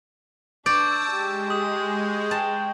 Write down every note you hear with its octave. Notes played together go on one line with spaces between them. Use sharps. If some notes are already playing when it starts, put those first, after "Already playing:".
D4 D5 A5 C#6 D6 E6 G6
G#3 G4
D#6
G5 A5